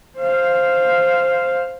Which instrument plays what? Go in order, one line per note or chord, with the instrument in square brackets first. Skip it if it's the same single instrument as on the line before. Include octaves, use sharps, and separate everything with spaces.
[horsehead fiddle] C5 F5